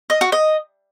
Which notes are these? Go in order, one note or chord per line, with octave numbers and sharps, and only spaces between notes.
D#5
F#4
D#5